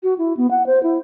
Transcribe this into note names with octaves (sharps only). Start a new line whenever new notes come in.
F#4
E4
B3
F#5
C5
E4